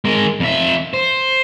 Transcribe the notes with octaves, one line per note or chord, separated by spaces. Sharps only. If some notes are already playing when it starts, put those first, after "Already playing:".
G#3 A#4
F2 E5
C5